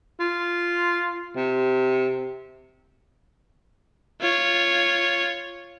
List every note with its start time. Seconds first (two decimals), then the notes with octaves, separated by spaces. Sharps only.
0.20 F4
1.36 C3
4.21 F4 C#5